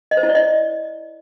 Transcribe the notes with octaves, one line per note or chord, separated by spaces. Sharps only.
D#5
C5
E4
D5
D#5